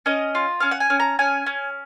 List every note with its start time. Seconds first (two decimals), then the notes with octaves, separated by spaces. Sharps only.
0.06 C#4 D#5
0.35 F4
0.60 C#4 F5
0.71 F#5
0.80 G#5
0.90 C#4
1.00 A#5
1.19 C#4 G#5
1.46 C#4